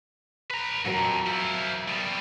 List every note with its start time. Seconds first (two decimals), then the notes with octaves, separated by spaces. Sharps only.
0.51 B4 A#5
0.86 F2 G#2 F#3 A#4 A#5
1.26 F3 E4
1.88 B2 G3